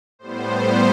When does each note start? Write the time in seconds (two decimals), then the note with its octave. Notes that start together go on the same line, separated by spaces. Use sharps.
0.19 A2 G3 B3 C5